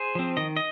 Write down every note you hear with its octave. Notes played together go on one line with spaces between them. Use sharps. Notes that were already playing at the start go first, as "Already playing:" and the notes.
Already playing: G#4 C5
F3 C4
D#3 D#5
D#5